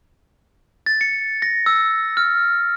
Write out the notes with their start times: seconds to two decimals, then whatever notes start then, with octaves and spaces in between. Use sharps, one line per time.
0.86 A6
1.01 C#7
1.42 A#6
1.66 E6
2.17 F6